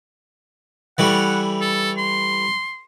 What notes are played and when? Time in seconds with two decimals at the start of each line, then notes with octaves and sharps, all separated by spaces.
0.98 E3 G3 A3 F#5
1.61 A4
1.97 C6